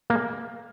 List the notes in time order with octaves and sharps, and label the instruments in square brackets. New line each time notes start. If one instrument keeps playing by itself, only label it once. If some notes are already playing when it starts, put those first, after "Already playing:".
[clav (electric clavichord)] A#3